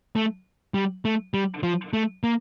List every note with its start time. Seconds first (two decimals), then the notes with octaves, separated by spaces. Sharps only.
0.16 A3
0.74 G3
1.05 A3
1.34 G3
1.63 F3
1.93 A3
2.23 A#3